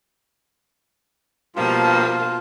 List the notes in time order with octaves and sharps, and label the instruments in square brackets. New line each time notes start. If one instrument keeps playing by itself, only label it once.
[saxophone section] G2 F3 [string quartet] B2 A#3 A5 [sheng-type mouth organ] F4